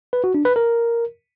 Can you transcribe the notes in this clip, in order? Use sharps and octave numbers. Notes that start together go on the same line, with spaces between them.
B4
F#4
D4
B4
A#4